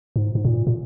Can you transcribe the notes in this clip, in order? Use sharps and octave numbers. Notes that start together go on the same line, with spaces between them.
G#2
G#2
A#2
A#2